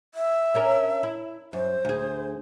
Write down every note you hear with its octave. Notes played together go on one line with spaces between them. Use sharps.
E5
C#4 D4 A#4
E4
F#2 C5
D2 G#4